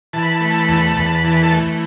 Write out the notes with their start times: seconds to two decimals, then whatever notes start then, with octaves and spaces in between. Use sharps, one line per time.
0.13 E3 A5
0.23 B5
0.31 A5
0.41 A3 B5
0.50 A5
0.59 B5
0.68 E2 A5
0.78 B5
0.87 A5
0.96 E2 B5
1.06 A5
1.15 B5
1.24 E3 A5
1.34 B5
1.43 A4 A5
1.52 A3